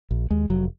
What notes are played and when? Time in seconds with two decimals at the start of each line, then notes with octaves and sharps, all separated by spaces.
0.11 A#1
0.30 D#2 G#3
0.50 F1 F#3